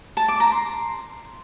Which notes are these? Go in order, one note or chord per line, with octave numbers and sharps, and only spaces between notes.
A5
D6
A#5
C6